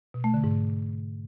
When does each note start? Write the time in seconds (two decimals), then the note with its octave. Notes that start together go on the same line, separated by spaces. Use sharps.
0.14 B2
0.24 A3
0.34 D3
0.44 G#2